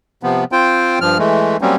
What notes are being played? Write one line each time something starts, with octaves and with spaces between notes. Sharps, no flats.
C3 F3 B3
C4 F4 C5 G5
G2 F3 F6
E3 G#3 A3
F#3 G3 A#3 C4 C#4